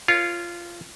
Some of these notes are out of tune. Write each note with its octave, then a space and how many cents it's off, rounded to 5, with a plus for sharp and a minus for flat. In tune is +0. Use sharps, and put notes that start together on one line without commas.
F4 -15 A#4 +0 C#5 +0